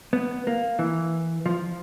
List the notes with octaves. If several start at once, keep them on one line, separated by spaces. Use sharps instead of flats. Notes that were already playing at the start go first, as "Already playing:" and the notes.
B3
A#3
E3
F3